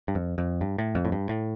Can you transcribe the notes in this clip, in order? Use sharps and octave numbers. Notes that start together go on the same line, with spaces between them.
G2
F2
F2
G2
A2
F2
A2
G2
A2